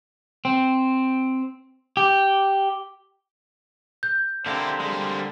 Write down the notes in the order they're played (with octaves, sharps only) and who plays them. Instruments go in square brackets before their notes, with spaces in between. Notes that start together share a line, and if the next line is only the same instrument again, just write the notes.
[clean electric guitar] C4
G4
[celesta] G6
[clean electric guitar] D3 A#3 C4 [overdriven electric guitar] E4 G4 [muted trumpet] C5
[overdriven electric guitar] G3 G#3